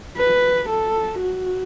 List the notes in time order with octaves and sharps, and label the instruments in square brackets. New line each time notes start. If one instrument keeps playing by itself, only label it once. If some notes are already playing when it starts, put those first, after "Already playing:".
[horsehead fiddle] B4
A4
F#4